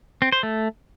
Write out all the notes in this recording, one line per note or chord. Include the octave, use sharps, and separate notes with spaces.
C4
C5
A3